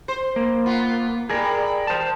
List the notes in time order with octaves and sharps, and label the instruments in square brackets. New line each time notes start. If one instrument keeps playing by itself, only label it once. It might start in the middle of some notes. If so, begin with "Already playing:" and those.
[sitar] C5
[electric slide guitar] A#3
[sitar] B3 F4
[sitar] G3 [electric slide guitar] G#4 A#4
[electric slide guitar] C5 A5